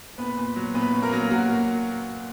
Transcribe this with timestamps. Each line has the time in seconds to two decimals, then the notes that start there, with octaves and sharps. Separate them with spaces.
0.18 A#2 B3 B4
0.37 A#2
0.56 F#3
0.74 A#2 B3 B4
0.93 C#4
1.03 A#3 A#4
1.13 F#3
1.31 A#2 F#4
1.50 A#3